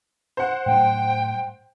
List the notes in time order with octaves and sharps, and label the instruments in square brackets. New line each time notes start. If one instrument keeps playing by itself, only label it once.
[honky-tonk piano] C5 F#5
[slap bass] A2 F#3 G3 [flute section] G5